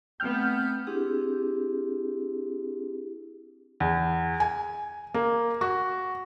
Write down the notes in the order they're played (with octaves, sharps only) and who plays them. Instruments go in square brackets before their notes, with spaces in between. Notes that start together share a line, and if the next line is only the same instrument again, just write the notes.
[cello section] A3 B3 [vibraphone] C4 G5 [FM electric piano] F6 G6
[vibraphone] C4 D4 E4 G4 G#4
[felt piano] E2
G#5
A#3
F#4